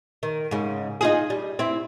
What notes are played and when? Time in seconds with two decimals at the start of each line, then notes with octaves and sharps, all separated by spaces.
0.23 D#3
0.51 G#2 C#3
1.01 D#4 F4 G#4
1.30 G3
1.59 C4 E4